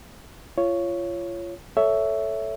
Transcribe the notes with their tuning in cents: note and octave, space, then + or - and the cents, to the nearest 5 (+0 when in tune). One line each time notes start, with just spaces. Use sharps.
F4 -25 C#5 +0
A4 +0 C#5 +15 E5 +0